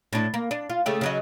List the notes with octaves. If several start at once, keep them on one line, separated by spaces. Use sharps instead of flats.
A2 D4
A#3
D4
F4
C#3 A3 G4
C#3 F#3 D#5